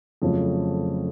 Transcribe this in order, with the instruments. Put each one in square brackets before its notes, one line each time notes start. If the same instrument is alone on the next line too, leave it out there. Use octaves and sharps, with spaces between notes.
[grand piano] F2 C#3 F#3 A3 C4